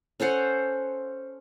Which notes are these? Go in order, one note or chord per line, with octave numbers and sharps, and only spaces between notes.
C#4 A4 C5 F#5